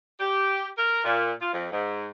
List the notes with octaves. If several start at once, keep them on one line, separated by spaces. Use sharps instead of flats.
G4
A#4
A#2
F4
F2
G#2